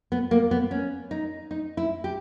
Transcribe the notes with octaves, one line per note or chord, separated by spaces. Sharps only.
B3
A#3
B3
C#4
D#4
D#4
E4
G4